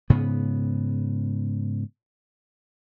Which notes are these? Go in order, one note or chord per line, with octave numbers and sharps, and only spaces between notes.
G#2 C#3 B3